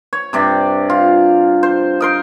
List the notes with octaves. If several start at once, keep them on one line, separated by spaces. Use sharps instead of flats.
C#5
G2 C3 D5
F4
C5
D#4 A#4 C6